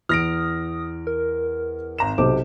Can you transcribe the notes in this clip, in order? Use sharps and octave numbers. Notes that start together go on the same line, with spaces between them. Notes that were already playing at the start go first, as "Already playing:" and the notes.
E2 D#6 F6 A#6 D7
A#4
G#1 A#5 E7
B1 C3 C5 D6